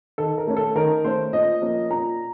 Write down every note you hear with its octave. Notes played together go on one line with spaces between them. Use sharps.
D#3 A4
A#4
A3 C#4
A4
D#3 A#4
A3 C#4 C5
A#2 D#5
F3 A#3 C#4
A#2 A#5